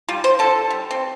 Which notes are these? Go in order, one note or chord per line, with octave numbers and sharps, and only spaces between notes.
G3 F4
C5
D3 A4
G3
C4